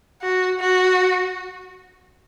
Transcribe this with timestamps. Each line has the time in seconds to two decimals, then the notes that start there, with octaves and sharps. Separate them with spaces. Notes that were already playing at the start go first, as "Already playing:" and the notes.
0.22 F#4
0.60 F#4